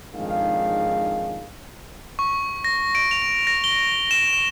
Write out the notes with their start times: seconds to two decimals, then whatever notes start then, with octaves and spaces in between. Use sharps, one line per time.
0.15 F2 G#2 D#3 D4 G#4 F5
2.19 C#6
2.64 A#6
2.95 D7
3.11 F7
3.47 A#6
3.64 G7
4.11 E7
4.33 E7